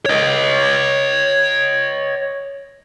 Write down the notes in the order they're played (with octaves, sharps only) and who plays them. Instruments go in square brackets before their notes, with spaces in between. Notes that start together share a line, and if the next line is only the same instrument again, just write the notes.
[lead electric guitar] C#5 D#5